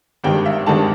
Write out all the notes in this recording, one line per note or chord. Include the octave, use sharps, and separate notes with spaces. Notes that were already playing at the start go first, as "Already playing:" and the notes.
G#1 G2 D#3 G#3 G5
E5
G#1 G2 D#3 G#3 A5